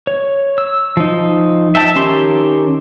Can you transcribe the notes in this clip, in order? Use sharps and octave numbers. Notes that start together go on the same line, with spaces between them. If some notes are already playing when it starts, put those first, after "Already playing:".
C#5
E6
F3 D#4
E5 G5 A5
D#3 C#4 G4 C6